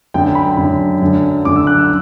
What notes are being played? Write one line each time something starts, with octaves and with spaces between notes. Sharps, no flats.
F#2 D3 G5
B5
F#2 D3
F#2 D3
F#2 D3 D6
E6
F#6
E6